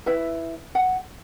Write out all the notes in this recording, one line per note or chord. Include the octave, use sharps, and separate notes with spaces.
E4 B4 E5
F#5